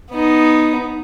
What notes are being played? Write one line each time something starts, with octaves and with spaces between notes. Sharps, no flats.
B3 D#4